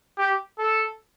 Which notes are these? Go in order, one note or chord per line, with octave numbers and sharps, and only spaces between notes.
G4
A4